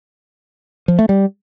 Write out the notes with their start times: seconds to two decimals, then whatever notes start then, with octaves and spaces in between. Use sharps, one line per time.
0.88 F3
0.99 A3
1.09 G3